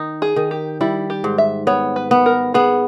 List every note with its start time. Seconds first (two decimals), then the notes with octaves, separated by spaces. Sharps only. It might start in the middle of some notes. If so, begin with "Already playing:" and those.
Already playing: D#3 D#4
0.22 G#4
0.36 D#3
0.51 G4
0.81 G3 E4
1.10 G4
1.24 G#2
1.38 E5
1.67 B3 C#5
1.96 B4
2.11 B3
2.26 A#4
2.54 B3 G#4